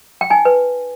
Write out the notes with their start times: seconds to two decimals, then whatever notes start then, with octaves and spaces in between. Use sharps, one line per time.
0.21 G5
0.30 D#4 G#5
0.45 B4